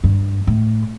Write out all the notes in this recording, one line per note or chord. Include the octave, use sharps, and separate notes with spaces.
G2
A2